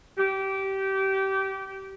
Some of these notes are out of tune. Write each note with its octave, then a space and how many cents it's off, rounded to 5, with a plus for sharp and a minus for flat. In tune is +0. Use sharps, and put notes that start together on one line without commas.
G4 -20